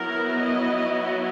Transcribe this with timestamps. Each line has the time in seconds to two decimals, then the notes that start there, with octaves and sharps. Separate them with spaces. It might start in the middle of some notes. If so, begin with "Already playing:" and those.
Already playing: F#3 B3 E4 A#4
0.40 D#5